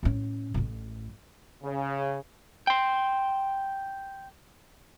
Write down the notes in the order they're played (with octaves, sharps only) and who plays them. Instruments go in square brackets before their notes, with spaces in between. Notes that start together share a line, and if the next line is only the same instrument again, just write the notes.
[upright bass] A2 C#4
A1 A2
[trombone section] C#3
[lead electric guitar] G5 C6